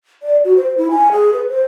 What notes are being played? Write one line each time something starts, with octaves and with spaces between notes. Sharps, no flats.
D5
F#4
C5
E4
G#5
G#4
B4
C5